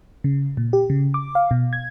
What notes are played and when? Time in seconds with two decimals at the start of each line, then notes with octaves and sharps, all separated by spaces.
0.24 C#3
0.57 A#2
0.73 G4
0.90 C#3
1.14 D6
1.35 F5
1.51 B2
1.73 G#6